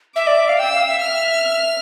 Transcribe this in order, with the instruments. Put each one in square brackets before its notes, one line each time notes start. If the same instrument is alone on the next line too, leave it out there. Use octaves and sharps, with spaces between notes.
[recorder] E5 [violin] D6
[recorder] D5
E5
F5
[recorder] G5 [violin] E6
[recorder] F5
E5
[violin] F6